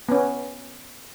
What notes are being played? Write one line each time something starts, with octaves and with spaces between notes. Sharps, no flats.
B3 C#4